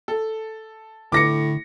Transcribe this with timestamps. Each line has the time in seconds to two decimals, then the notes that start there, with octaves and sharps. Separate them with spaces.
0.08 A4
1.12 A2 D3 D6 A#6 C#7